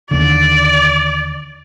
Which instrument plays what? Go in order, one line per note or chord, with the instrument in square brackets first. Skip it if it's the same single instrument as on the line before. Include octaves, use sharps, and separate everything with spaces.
[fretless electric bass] D#2 D3 [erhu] D5